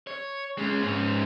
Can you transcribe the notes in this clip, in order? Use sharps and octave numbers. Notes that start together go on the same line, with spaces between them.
C#5
G#3 C#4
G#2 C#4